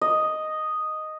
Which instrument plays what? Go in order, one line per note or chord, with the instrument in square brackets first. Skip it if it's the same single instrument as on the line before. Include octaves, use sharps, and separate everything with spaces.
[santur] D#5